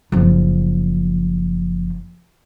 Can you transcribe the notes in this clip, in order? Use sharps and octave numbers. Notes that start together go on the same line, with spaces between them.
F#1 F3